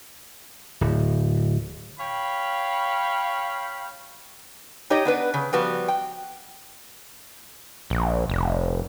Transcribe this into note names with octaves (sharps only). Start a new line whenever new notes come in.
D1
C#5 F5 G5 B5
D#4 G4 C#5 D#5
B3 D4 B4
C#3
F3 G3 B3 F#4
G5
A#1
F1